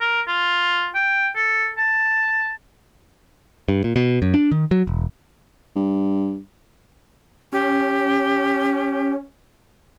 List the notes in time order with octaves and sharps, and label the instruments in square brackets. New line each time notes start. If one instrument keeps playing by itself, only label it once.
[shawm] A#4
F4
G5
A4
A5
[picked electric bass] G2
A#2
B2
F#2
D4
D#3
F#3
E1
[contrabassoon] G2
[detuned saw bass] C#4 [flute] G4